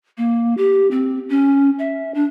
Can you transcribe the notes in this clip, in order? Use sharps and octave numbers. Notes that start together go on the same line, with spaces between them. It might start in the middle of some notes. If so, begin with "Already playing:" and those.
A#3
G4
C4
C#4
E5
D4